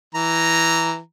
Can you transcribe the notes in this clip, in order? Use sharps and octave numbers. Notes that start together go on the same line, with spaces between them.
E3 A#5